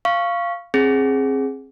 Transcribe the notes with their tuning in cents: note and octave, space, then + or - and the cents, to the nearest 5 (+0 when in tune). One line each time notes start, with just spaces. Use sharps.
F5 -10 C#6 +0
C4 +30 G#4 +5